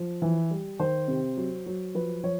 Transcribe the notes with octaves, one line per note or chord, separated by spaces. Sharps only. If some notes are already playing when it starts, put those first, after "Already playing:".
Already playing: F3
E3
G3
D#3 C5
C3
F#3
F#3
F3 B4
F3 C#5